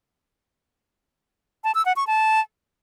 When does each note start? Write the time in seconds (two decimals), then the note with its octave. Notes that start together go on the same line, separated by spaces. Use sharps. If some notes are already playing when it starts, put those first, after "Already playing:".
1.64 A5
1.75 E6
1.86 F#5
1.96 C#6
2.07 A5